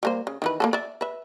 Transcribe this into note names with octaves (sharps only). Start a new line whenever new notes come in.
G3 A#3 C5
C#3
D#3 E3 B4
A#3 B3 A4
D5 E5
B4 E5